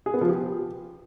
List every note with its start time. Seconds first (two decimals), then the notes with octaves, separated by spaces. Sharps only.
0.06 G#4
0.14 B3
0.21 F3
0.29 G4